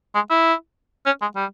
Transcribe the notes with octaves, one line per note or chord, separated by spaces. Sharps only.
G#3
E4
C#4
G#3
G3